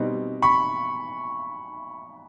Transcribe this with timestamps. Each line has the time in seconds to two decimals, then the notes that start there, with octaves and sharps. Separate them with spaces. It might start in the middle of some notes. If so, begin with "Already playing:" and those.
Already playing: B2 G3 C4 D#4
0.42 B5 C#6